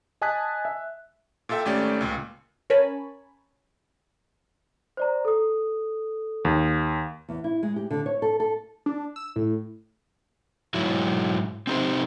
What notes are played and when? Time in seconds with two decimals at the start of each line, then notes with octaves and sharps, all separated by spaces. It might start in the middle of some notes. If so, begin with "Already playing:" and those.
0.21 D#5 G#5 A5 D#6 F#6 B6
0.65 E5
1.49 A#2 F4 A4 E5 G5
1.65 G#1 A3 C#4 G4 D5
2.01 C#2 A#2
2.70 C#4 A#4 C#5 G#5 A5 B5
4.97 C5 D5 A#5
5.25 A4 D#6
6.45 D#2
7.29 E2
7.44 E4
7.63 G#3
7.76 G4
7.91 D3
8.06 C#5
8.22 A4
8.40 A4
8.86 D4
9.16 E6
9.36 A2
10.74 G#2 F#3 E4
11.67 C4 D#4 G4 C5